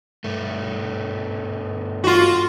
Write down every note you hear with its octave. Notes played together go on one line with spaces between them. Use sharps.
G2 A3
F4 F#4